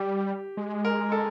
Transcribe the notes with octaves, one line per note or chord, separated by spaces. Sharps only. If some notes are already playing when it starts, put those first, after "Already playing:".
Already playing: G3 G4
G#3
A#4
A4